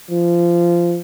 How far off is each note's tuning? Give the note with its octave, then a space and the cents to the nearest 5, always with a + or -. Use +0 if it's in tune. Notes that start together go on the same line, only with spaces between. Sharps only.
F3 -20